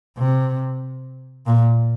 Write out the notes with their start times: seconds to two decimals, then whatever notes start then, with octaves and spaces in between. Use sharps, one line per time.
0.18 C3
1.47 A#2